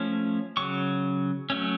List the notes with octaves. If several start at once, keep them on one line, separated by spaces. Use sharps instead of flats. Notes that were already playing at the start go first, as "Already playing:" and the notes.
Already playing: F3 A3 C#4
C#3 F#3 C#6
F#3 A3 C#4